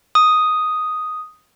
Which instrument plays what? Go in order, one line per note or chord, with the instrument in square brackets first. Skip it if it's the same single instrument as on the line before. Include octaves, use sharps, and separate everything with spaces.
[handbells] D#6